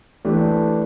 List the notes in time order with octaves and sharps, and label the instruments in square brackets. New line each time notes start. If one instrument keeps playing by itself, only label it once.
[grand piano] E3 A3 D4 G4